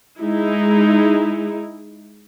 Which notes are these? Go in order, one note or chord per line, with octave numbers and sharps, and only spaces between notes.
G#3 D#4 E4